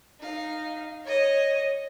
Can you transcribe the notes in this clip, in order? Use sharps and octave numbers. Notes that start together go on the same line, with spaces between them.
D#4 F5
C#5 D#5